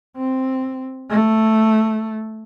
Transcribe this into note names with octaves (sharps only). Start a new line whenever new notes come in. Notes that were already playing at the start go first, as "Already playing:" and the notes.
C4
A3